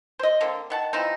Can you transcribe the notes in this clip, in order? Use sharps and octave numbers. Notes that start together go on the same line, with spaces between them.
C5 D#5
D3 A#3 C4
D#3 F#5 A5
E3 F3 C4 D#4